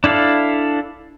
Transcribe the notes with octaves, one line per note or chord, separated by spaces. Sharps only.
D4 E4 A4 F5